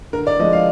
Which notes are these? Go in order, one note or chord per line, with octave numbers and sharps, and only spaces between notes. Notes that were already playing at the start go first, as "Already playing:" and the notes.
D3 A#4
D5
F3 G#3 D#5
F5